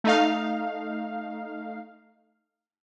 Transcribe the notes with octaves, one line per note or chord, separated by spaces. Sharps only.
A3 D#4 F5